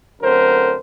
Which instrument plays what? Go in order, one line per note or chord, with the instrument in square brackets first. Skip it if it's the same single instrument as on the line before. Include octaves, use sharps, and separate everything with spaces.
[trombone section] F#2 D3 F#3 A3 C4 A#4 C5